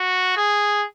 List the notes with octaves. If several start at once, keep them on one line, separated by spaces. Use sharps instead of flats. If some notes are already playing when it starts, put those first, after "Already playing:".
Already playing: F#4
G#4